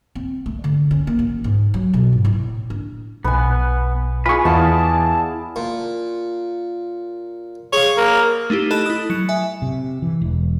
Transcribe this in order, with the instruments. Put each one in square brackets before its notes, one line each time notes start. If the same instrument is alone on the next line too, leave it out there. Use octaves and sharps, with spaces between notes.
[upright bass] C4
A3
D3
C#4
A#3
A1
G#2
F#3
B2
G#2
A2
D4
[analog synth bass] B1 [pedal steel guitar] B3 [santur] B4 G#5
[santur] F4 G#4 [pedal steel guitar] B4 C#6 [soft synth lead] G#5
[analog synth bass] E2 [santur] B3 E4 F5 [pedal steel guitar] D5 [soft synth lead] A5
[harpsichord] A#2
[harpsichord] G#4 F5 [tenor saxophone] C#5
[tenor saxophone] A#3
[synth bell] A3 D#4 E4 G4
A4 D#5 A5 B5 F#6 E7
E4 D#6
F#3 C#7
E5 G#5
[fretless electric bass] C3
E3
E1